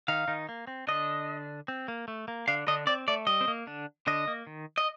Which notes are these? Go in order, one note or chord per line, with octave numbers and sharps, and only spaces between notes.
D#3 D#4 F5
D#3 D#4
A#3
C4
D3 D4 D#5
C4
A#3
A3
A#3
D3 D4 F5
D3 D4 D#5
C4 D5
A3 D5
G3 D#5
C4
A#3
D3 D4
D3 D4 D#5
A#3
D#3
D#5